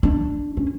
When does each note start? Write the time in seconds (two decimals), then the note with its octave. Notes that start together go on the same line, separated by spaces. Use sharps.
0.03 D4
0.57 C#4